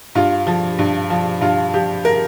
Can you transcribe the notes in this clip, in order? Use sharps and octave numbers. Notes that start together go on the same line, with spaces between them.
G2 F4
F3
G2
F3
G2 F4
F3 G4
A#4